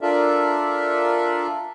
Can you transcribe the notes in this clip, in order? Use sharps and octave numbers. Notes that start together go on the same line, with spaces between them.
D4 F4 A4 A#4 D5 E5